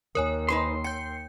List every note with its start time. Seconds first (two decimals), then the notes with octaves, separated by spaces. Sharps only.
0.15 D#2 A#4 C#5 G#5
0.49 D#4 B4 C5 C6
0.84 G5 G6 C#7